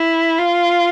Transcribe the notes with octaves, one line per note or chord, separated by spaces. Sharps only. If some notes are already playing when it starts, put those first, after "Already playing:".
Already playing: E4
F4